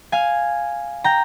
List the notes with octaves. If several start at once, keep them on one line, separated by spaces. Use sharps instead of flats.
F5 G#5
G5 A#5